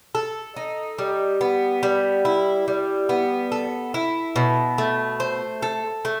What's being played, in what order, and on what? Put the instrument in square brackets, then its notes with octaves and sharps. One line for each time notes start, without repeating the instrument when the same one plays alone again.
[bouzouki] A4
D#4
G3
B3
G3
E4
G3
B3
A4
E4
B2
A3
C5
A4
A3